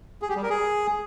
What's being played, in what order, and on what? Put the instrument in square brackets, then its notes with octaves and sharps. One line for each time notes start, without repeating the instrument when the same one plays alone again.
[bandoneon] G#4
G4
G3
A#4
G#4